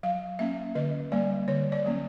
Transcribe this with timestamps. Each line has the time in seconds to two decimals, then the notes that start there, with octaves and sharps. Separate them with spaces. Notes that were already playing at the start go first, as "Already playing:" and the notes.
0.03 F#3 F5
0.39 A#3 C#4 E5
0.75 D3 D#5
1.12 G3 A#3 D5
1.48 D3 C#5
1.72 D5
1.85 F#3 A#3 C#4